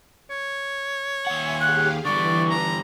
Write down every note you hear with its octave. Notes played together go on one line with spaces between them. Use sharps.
C#5
D#2 E5 F#5 G#5
G4 G#4 F5 F#6
D3 E3 G3 D5 C#6
A#5